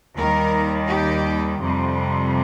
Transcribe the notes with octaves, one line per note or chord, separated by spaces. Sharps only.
D#2 D#3 G3 A#4
G4
F2 C3 G3